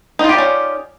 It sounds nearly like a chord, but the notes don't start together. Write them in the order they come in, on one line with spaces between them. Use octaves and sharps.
D#4 F4 G4 D5 C#4